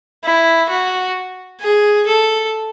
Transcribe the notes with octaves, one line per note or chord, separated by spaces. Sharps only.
E4
F#4
G#4
A4